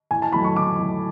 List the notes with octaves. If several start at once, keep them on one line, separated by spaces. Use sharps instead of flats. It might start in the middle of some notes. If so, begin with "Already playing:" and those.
A2 G#5
A5
F#3 A3 B5
C#6
A2 D6
F#3 A3